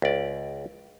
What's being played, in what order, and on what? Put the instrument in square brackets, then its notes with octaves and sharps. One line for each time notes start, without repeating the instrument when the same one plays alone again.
[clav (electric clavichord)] C#2 D5